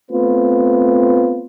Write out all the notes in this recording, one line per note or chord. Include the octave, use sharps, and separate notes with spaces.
A3 B3 C4 F4 B4